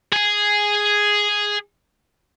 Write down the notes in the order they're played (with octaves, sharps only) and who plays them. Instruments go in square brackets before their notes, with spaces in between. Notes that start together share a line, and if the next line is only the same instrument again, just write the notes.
[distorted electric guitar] G#4 G#5